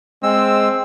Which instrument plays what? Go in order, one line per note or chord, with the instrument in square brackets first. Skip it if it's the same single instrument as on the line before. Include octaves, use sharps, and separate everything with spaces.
[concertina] G#3 E6 [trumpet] C4